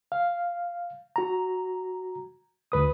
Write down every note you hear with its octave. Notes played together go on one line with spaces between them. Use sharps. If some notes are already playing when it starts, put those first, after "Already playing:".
F5
F#4 A#5
D2 B4 D#6